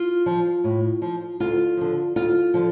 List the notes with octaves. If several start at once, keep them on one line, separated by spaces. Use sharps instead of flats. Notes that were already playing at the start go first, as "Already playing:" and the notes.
Already playing: F4
F3
A2
F3
D2 F4
D3 F3
D2 F4
D3 F3